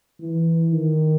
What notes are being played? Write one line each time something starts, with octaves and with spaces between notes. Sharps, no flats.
E3
D#3